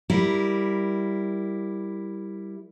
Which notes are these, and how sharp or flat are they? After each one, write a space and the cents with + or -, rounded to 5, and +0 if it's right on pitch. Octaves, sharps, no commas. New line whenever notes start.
G3 +0 E4 +0 A#4 +0